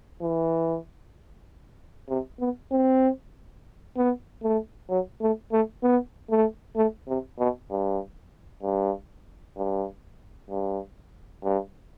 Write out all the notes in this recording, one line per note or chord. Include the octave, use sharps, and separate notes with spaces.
E3
C3
B3
C4
B3
A3
F#3
A3
A3
B3
A3
A3
C3
B2
G2
G2
G2
G2
G2